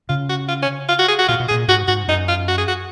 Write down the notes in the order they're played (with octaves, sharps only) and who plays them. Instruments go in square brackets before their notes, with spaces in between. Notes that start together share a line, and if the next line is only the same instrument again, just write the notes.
[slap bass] C#3 [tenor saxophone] F4
[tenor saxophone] F#4
F4
C#4
F4
F#4
G#4
F#4
[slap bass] A#2 [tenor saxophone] F4
[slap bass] B2
[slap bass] A#2 [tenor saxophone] G#4
[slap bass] G#2 [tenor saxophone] F#4
[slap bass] G#2 [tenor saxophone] F#4
[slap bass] F#2 [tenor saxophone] D#4
[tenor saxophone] F4
F#4
G#4
F#4